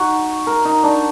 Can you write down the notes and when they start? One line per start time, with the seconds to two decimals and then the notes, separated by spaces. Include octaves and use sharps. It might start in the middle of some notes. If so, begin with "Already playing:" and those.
Already playing: D#4 F#4
0.47 A#4
0.65 D#4
0.84 D4